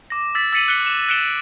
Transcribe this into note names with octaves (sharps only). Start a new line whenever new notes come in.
D6 A#6
E6 A6 B6
E6 A6 B6 C#7 D#7 F#7
F#6 B6 C#7 G7
E7
F#6 A6 C#7 D7 E7 G7